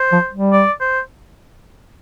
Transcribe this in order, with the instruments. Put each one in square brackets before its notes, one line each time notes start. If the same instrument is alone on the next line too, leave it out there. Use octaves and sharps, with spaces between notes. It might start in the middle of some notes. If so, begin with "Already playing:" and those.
Already playing: [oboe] C5
[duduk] F3
G3
[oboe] D5
C5